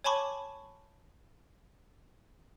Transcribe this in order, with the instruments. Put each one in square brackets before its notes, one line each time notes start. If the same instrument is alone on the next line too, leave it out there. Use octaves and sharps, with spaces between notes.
[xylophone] C#5 G#5 A5 B5 C#6 D6